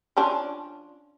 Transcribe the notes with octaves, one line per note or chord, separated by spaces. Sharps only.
F3 C#4 D4